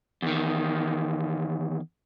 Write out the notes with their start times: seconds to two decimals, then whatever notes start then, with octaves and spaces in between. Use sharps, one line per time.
0.22 E2 D#3